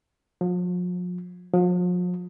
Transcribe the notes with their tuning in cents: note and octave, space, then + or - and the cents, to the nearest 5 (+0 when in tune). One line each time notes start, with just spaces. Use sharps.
F3 +40
F3 +40